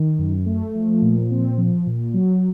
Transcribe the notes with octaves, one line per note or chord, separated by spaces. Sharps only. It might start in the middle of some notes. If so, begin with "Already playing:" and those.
Already playing: D#3
F#2
A3
F3
A#2
C4
F3
A#2
F#3